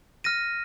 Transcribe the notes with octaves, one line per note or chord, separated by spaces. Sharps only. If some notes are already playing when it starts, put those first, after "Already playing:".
F6 A#6 D#7